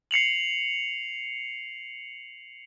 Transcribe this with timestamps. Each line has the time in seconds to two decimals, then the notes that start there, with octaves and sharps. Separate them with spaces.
0.11 C7 C#7 F7 F#7